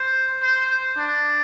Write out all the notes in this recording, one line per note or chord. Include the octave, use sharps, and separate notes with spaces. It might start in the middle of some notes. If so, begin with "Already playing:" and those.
Already playing: C5
C5
D4